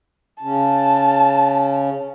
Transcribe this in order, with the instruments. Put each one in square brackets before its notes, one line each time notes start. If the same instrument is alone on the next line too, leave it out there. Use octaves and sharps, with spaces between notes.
[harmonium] C#3 C#4 [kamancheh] A5